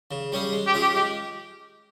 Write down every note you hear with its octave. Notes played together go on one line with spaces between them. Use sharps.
C#3
G3 C#4 G#4
G#3
G4
C#4 F4 G#4
G4
G#3 G4